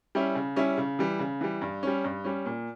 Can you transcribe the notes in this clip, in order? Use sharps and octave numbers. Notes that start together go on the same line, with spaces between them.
G3 C#4 E4
C#3
G3 C#4 E4
C#3
E3 G3
C#3
E3 G3
G2
G3 C#4
G2
G3 C#4
A#2